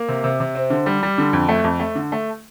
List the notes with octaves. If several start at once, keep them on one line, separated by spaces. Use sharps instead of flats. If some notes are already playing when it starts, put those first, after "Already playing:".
Already playing: A#3
C3
C3
C3
C4
D3
G3
G3
D3
F2
A3
F2
A3
D3
A3